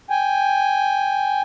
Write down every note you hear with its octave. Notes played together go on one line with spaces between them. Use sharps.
G5 G#5